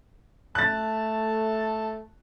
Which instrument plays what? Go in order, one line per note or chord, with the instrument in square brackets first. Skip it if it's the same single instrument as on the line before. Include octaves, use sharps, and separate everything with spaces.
[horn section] A3 A5 [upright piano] F#6 A6